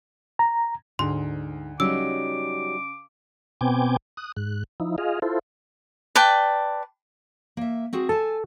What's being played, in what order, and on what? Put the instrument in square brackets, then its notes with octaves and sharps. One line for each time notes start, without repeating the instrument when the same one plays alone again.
[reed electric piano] A#5
[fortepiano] D2 [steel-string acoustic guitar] G#2 [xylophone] C6
[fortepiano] C#3 [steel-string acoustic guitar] F#3 G3 D#4 [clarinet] D6 [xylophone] E6
[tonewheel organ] B2 B3 C4 G5 G#5 D6
D#6 F#6
G#2 F#6
F3 D#4 E4
F4 G#4 D#5 F5
E4 F4 A4 C5
[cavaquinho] B4 D5 G5 A5
[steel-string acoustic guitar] A#3 E5
C4 F#4 G#4
[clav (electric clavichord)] A4 [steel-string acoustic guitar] G#5 A5